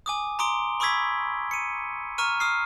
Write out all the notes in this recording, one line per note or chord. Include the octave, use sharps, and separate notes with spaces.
G#5 D6 D#6
A#5 C6 D6 D#6 D7 G7
B5 C#6 D#6 E6 G#6 B6
C#7 D#7
A#5 C#6 F6 D#7
D#6 F6 C7